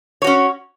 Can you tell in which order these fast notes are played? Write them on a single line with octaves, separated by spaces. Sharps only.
C#5 F#4 C#4